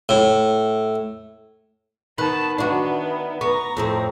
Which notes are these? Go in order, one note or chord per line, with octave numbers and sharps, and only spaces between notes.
A2
D#3 B3 A5 B5 F#6
D#3 B3 D4 E4 F#4
B3 A#5 C#6
F2 A2 C4